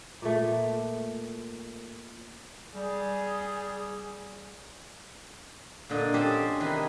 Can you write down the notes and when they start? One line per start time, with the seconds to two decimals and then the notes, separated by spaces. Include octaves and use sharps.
0.22 A#2 A3
2.75 G3 G#4
5.89 A#2 D3 D#5
6.14 C4 C#4 G4 A4 C5
6.60 C3 D#3 E3 G#4 B4